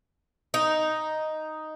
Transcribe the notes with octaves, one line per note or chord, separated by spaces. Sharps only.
D#4